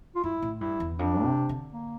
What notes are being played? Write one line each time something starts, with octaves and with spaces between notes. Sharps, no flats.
F4
G2 E4
A2
G2 E4
E2
F2 D4
C3
D3
A#3